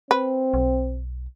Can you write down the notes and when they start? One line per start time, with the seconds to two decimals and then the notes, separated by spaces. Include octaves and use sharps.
0.11 C4 B4
0.54 B1